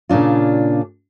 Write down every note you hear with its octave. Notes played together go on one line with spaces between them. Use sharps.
A#2 C#3 D4 F4